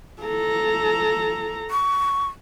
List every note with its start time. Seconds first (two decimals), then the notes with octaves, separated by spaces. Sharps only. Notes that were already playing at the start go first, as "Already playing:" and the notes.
0.22 A4 A#5
1.71 C#6